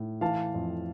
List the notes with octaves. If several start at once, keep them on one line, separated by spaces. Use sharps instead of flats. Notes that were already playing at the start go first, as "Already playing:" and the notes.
Already playing: A2
E3 F5 A5
F2